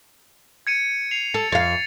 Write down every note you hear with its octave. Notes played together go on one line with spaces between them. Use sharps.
G#6 C#7 D#7
C7 F7
A4 A6
F2 F5 A6